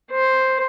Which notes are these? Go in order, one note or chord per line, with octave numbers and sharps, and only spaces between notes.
C5